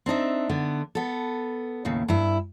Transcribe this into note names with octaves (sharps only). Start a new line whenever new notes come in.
C4 D4 D#4 E5
D3 B3
B3 A4
D#2 A2 C#3
G2 E4